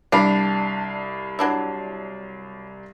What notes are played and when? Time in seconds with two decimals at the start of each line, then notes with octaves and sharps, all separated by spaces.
0.12 C2 D4 F5 B5
1.39 F#3 D4 E4